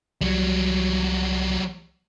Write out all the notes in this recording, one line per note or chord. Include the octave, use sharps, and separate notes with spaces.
C2 F#3 G3